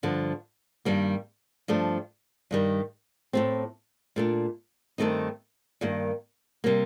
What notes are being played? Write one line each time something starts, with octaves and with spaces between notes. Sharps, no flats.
G2 D3 F3
G2 D#3 G3 A#3
G2 F3 A3 D4
G2 D#3 G3
A2 A3 C4
A#2 A3 D4
G2 D#3 A3 C4 D#4
G2 D#3 A#3
C3 G3 A#3